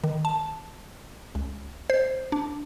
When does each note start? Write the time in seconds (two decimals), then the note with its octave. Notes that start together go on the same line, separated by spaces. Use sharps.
0.04 D#3
0.25 A5
1.35 C#2
1.90 C5
2.32 D4